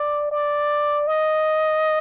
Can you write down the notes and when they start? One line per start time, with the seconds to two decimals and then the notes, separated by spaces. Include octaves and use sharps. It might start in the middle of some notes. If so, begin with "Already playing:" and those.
Already playing: D5
0.32 D5
1.07 D#5